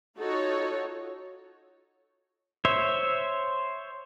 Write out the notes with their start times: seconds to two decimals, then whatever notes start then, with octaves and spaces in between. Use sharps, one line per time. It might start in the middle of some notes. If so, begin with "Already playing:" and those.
0.19 D#4 F4 F#4 A4 C#5
2.65 C5 C#5 E5